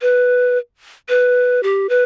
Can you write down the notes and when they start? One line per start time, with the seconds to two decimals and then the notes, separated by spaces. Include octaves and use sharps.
0.01 B4
1.09 B4
1.63 G4
1.89 B4